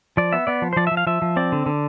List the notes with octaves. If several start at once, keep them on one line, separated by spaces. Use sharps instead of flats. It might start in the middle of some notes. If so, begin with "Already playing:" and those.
F3 D5
B3 E5
B3 D5
F3
C5
F3 D5
F3 E5
F5
F3 E5
F3
C4 D5
D3
D3